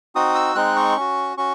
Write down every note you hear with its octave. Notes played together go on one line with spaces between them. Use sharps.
C4 D#4 F#4 D#6
E6
G#3 C4 D#4 F#6
C#6
C#4 F#4
C#4 F#4 C#6